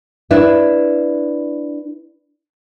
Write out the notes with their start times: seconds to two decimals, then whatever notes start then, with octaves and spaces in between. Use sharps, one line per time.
0.31 D4 E4 B4